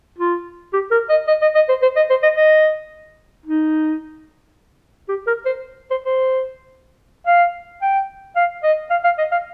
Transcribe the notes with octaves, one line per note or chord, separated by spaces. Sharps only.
F4
G4
A#4
D#5
D#5
D#5
D#5
C5
C5
D#5
C5
D#5
D#5
D#4
G4
A#4
C5
C5
C5
F5
G5
F5
D#5
F5
F5
D#5
F5